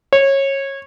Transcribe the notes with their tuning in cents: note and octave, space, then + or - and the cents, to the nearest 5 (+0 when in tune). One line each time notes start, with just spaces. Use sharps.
C#5 -20